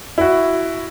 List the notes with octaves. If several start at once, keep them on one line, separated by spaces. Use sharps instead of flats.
E4 F#4